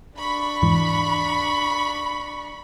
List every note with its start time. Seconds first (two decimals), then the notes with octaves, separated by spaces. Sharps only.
0.18 D4 B5 C#6
0.62 E2 G#2 E3